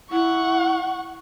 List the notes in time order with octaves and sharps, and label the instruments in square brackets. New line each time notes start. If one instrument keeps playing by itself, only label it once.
[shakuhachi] E4 [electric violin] F#5 C#6